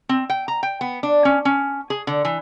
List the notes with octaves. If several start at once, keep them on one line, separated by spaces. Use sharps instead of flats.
C4
G5
A#5
G5
B3
D4
C#4
C#4
G#4
D3
E3